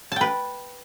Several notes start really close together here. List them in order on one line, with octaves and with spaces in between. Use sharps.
A5 G5 B4